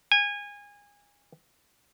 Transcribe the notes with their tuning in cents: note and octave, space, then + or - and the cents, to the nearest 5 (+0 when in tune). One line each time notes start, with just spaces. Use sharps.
G#5 -25